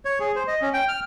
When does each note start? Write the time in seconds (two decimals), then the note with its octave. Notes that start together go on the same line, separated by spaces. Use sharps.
0.05 C#5
0.20 G#4
0.36 C5
0.47 D#5
0.62 C#4
0.73 G5
0.88 F6